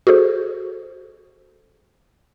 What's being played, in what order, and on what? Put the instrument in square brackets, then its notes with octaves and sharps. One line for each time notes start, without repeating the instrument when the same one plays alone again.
[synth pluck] F#4 G#4 A4 C5